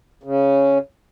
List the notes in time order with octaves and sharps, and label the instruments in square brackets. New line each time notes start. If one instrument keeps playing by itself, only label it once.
[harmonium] C#3